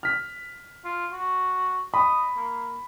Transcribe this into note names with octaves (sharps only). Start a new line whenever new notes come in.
F6 B6
F4
F#4
D#5 B5
A#3